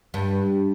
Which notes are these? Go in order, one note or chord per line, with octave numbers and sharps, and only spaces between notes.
G2